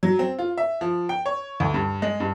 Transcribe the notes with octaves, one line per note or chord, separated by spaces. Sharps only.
F#3
C4
F4
E5
F3
G5
C#5
D2
G2
G#3
G2